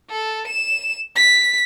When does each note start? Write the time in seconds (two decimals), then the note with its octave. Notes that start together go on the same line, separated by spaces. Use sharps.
0.10 A4
0.48 E7
1.16 B6